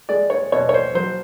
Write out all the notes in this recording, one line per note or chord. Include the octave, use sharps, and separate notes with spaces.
G#3 D5
C#5
B2 C#5
C#5
C5
F#3 C5